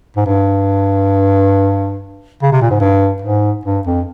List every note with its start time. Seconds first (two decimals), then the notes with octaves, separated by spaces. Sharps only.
0.17 G#2
0.26 G2
2.42 C#3
2.52 C3
2.62 A#2
2.71 G#2
2.80 G2
3.22 G#2
3.65 G2
3.86 F2